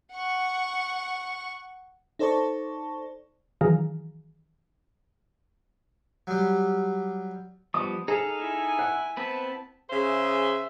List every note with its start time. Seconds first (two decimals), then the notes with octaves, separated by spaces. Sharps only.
0.12 F#5 C#6
2.19 D#4 A4 C5 D5 A5 C#6
3.61 D#3 E3 F#3 G#4 F5 A#5
6.27 F#3 G3
7.74 F3 G3 B3 D#6
8.08 D#4 G#4 A4 F5
8.39 E4 G#5
8.79 F#5
9.17 B3 C4 B4 A5
9.90 C#3 G#4 C5 E5